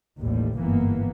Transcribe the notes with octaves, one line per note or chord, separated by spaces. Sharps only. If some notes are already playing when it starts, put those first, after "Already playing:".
A1 D#2 A2 G3
G1 G#2 E3 A#3 B3